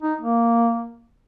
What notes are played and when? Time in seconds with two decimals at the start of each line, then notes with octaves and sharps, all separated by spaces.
0.03 D#4
0.21 A#3